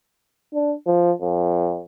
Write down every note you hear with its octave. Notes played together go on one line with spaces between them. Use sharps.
D4
F3
F2